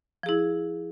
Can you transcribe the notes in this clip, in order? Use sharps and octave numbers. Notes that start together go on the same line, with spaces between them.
F3 E4 G#4